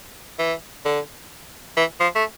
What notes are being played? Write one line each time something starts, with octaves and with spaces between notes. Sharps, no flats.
E3
D3
E3
F3
A3